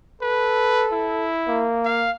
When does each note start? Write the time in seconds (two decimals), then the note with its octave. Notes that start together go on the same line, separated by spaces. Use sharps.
0.22 A4 B4
0.93 E4
1.48 A#3
1.85 F5